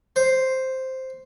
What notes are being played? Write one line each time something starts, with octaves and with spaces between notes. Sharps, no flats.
C5